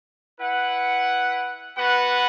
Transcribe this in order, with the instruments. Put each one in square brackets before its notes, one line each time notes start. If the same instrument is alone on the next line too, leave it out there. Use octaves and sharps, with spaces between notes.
[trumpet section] E4 B4 F#5
B3 F#4 B4 F#5